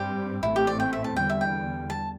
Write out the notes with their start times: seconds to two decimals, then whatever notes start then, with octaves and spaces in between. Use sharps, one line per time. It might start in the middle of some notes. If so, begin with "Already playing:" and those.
Already playing: G2 G3 C4 G4
0.43 A1 A2 A3 C4 E4
0.56 G4
0.67 D5
0.80 G5
0.93 E5
1.04 A5
1.16 E2 D3 G3 G5
1.30 E5
1.41 G5
1.90 A5